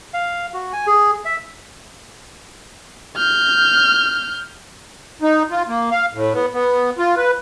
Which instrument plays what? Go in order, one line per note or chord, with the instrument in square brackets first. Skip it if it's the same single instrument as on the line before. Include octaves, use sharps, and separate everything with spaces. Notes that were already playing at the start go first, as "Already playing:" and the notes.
[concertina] F5
F#4
G#5
G#4
E5
[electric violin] F6 G6
[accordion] D#4
F4
A#3
F5
A2
B3
B3
F4
B4